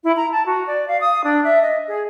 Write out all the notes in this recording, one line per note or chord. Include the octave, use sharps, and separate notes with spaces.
E4
A#5
A5
F#4
D5
F5
D#6
D4
E5
D#5
G#4